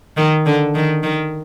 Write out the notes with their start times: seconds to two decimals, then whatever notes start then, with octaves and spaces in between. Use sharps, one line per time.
0.17 D#3
0.46 D3
0.75 D#3
1.03 D#3